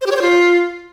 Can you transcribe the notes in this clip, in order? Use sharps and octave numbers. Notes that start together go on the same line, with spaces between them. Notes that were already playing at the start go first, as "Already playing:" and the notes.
C5
G4
C#5
C5
F4